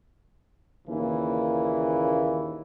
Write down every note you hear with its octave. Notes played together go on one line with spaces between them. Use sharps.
D#2 A#2 C#3 E3 A#3